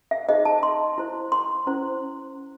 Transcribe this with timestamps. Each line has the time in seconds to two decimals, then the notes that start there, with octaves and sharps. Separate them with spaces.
0.11 E5
0.29 D#4 G#4 C5 D#5
0.45 A5
0.63 C6
0.98 E4 C5
1.32 C6
1.67 C#4 E4 C5